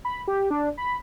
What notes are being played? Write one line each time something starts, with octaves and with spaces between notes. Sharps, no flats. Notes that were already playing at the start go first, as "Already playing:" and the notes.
B5
G4
D4
B5